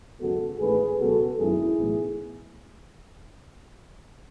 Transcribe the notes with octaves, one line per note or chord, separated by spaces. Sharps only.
G#1 F#2 C#3 G#3 B3 F#4 A4
A1 G#2 D#3 A3 G#4 B4
C#2 B2 F#3 B3 F#4 A4
G#1 F#2 D#3 G#3 B3 E4 G#4
B1 A2 E3 B3